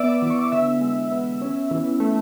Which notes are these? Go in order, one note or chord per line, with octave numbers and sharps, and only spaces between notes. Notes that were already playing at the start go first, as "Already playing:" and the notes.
Already playing: B3 D5 E5 D6 E6
E3 D6
C#6
D5 D6
D3 E5 E6
G#3
B3
C#4
E3
A3